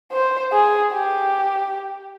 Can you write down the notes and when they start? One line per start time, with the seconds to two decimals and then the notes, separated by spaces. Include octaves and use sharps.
0.12 C5
0.53 G#4
0.93 G4